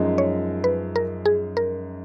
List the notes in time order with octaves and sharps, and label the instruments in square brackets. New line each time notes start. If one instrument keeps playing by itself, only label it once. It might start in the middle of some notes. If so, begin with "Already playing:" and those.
Already playing: [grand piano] F#2 F3 G#3 D#4
[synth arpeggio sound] C#5
B4
A#4
G#4
A#4